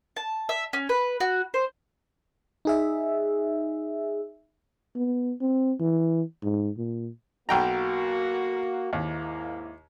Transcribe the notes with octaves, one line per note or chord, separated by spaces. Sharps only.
A5
E5
C#4
B4
F#4
C5
D#4 G#4 E5
B3
C4
E3
G#2
A#2
B1 A#3 F#4 G5 A#5
D#2 G#2 A#3 E4